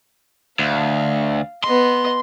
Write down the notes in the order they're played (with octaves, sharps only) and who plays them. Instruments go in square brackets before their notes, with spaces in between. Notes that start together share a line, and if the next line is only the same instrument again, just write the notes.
[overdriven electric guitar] D2 [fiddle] F5
[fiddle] B3 D#5 [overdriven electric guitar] C6